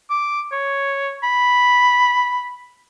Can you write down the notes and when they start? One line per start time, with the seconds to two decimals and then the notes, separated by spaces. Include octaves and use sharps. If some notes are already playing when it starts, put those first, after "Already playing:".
0.10 D6
0.52 C#5
1.23 B5